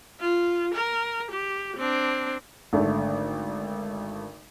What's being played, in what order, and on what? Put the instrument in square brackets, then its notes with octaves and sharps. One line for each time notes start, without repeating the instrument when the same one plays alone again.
[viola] F4
A#4
G4
C4 D4
[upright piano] G#1 D3 A3